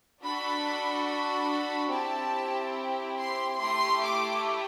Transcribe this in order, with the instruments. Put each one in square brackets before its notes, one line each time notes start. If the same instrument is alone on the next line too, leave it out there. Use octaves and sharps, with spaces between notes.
[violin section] D4 F#4 A4 B5
B5
C4 E4 G4 A5
C6
A3 E4 G4 C6
D6